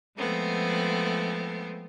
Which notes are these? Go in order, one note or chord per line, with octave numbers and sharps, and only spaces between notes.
F3 G#3 A3 B3 C4